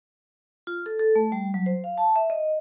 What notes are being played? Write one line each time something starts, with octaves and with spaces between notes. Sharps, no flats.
F4
A4
A4
A3
G3
F#3
C5
F5
A5
E5
D#5